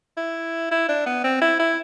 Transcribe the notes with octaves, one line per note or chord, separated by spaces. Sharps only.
E4
E4
D4
B3
C4
E4
E4